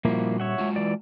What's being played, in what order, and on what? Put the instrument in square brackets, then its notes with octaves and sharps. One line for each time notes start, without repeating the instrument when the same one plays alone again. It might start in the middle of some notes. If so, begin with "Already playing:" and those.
[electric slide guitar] A#2 G3 F#4 [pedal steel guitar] F3 A#3 E4
[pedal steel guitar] C#5 E5 F#5
[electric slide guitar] G#3 F4 F#4
[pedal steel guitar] E3 D5